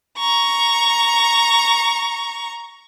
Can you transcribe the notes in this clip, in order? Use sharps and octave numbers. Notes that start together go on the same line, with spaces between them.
A#5 C#6